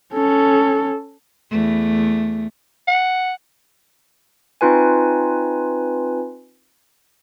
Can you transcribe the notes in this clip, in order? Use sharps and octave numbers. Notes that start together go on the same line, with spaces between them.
C#4 A4
E2 A3
F#5
C4 D#4 F4 B4 G#5